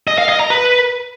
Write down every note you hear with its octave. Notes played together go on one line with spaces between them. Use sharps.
D#5
F5
D#5
A#5
B4